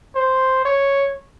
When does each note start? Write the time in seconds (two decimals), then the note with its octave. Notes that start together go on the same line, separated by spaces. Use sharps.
0.16 C5
0.65 C#5